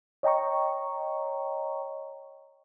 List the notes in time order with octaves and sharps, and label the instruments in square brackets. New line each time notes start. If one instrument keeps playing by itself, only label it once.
[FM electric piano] C#5 D#5 G5 A#5 C#6